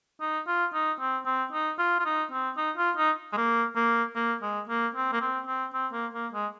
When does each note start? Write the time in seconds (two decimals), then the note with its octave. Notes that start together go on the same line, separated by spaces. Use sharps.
0.21 D#4
0.47 F4
0.73 D#4
0.99 C4
1.25 C4
1.52 D#4
1.79 F4
1.99 F4
2.05 D#4
2.31 C4
2.57 D#4
2.77 F4
2.97 D#4
3.33 G#3
3.37 A#3
3.76 A#3
4.15 A#3
4.42 G#3
4.69 A#3
4.95 C4
5.12 A#3
5.21 C4
5.47 C4
5.73 C4
5.93 A#3
6.14 A#3
6.33 G#3